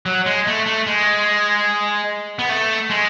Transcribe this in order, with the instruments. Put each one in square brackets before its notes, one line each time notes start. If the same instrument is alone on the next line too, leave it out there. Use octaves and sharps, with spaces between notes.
[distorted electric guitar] F#3
G#3
A3
A3
G#3
B3
A3
G#3